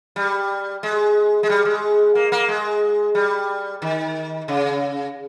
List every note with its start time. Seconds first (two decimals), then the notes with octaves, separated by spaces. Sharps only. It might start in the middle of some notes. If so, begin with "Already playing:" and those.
0.16 G3
0.83 G#3
1.43 G#3
1.50 G3
1.65 G#3
2.15 A#3
2.32 A#3
2.48 G#3
3.15 G3
3.82 D#3
4.48 C#3